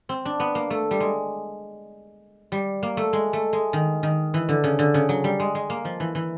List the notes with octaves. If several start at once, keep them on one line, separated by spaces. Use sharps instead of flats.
C4
D4
B3
A#3
A3
G3
G#3
G3
A#3
A3
G#3
A3
G#3
D#3
D#3
E3
D3
C#3
D3
C#3
F#3
G3
G#3
G#3
A#3
F3
E3
E3